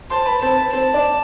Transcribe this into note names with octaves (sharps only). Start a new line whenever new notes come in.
C5 A5 C6
B4 B5
C4 C5 A5
B4
C4 C5 A5
D4 D5